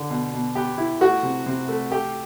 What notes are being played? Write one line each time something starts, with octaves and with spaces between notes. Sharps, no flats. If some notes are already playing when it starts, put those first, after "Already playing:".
Already playing: D3
B2
B2
B3 G4
E4
A3 F#4
C3
C3
A3
A3 G4